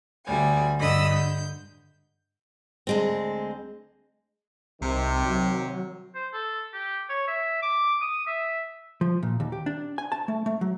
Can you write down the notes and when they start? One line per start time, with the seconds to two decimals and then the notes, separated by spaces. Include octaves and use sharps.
0.24 D2 G3 G#5
0.78 G2 D3 D#5 B5 D#6 E6
1.13 G6
2.87 D2 G#3 C4
4.81 C2 C3 D#3
5.24 F#3
6.15 C5
6.34 A4
6.74 G4
7.09 C#5
7.28 E5
7.63 D6
8.02 D#6
8.27 E5
9.01 F3
9.23 A#2
9.40 D#2
9.52 G4
9.66 D4
9.98 G#5
10.12 A5
10.28 A3
10.46 A3
10.61 F#3